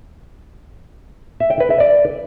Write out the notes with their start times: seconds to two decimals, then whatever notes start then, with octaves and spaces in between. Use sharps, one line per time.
1.40 E5
1.50 G5
1.60 B4
1.70 E5
1.80 D5